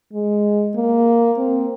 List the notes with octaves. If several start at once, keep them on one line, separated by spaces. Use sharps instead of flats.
G#3
A#3
C4